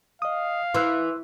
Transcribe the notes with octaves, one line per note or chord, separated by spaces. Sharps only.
D#5 F5 D#6
E3 C6 E6 F#6